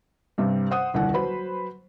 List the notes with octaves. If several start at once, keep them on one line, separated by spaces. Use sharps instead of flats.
G2 C3 G3
C5 F#5 D#6
D#1 C2 D3 D4 F#5
F#3 B4 C5 B5